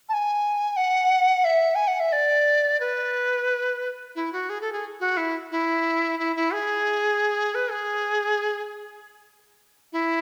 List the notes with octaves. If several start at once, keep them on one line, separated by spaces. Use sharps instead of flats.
A5
G#5
F#5
E5
G#5
F#5
E5
D5
B4
E4
F#4
G#4
A4
G#4
F#4
E4
E4
E4
E4
G#4
B4
G#4
E4